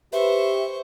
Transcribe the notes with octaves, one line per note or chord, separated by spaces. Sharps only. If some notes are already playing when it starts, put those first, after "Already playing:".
G4 B4 C5 E5 C#6